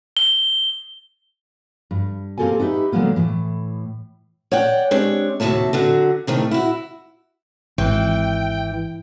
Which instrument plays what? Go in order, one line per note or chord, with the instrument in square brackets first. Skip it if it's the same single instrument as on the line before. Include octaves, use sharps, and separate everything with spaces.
[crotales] G7
[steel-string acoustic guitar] G2
A#3 C4 G4 A4 A#4 G#5
D#4 G4 B4 E5
D3 F#3 G#3 A#3 B3
A2 E3
C#5 D5 F#5 G5
G#3 C4 D4 G4 C#5
D#2 C3 F#3 F#4 E5 A5
D3 F#3 F#4
C3 D#3 A3
E4 F#4
[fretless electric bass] G#1 [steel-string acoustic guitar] E3 [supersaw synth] G5